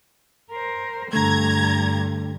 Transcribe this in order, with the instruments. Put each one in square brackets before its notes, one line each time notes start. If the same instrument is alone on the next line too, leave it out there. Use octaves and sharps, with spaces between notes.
[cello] A#4 C5
[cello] G2 [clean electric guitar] D3 A3 [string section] A#5 G#6